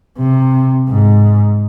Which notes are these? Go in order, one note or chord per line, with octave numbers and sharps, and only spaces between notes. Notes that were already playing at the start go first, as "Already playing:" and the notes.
C3
G#2